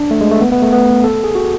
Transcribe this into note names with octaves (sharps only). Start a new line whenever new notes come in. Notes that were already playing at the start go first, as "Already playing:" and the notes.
Already playing: D4
A3
G#3
A3
B3
B3
A3
B3
A4
G#4
F#4